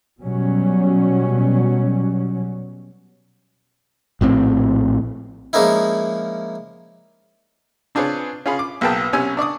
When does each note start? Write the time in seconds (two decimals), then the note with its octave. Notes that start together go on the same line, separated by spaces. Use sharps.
0.20 B2 F#3 G3 C#4
4.21 A#1 A2 C#3 C4
5.53 F3 G#3 A#3 C#4 D#4 E4
7.95 C4 D4 F4 G#4 B4 C#5
8.46 C#4 F4 G#4 B5
8.59 D6
8.81 B1 A#3 G#4 B4 G5 A5
9.13 B1 C3 C#4 G#5 E6
9.37 D4 D5 C#6 D#6